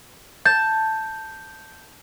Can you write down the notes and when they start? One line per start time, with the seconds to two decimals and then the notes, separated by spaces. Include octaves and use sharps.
0.46 A5 G6